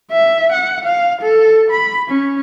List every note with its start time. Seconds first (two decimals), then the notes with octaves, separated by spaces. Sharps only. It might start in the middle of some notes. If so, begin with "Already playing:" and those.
0.12 E5
0.52 F#5
0.85 F5
1.22 A4
1.71 B5
2.09 C#4